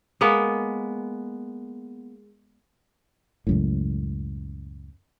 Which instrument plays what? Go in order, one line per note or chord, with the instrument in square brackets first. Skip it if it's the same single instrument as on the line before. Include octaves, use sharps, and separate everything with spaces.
[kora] G#3 A#3 B3
[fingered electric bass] C#2 F#2 A2